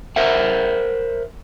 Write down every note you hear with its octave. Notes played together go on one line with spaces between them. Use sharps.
A#4 C5 E5 F#5